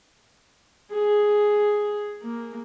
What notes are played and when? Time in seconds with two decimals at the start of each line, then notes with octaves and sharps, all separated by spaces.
0.91 G#4
2.22 A#3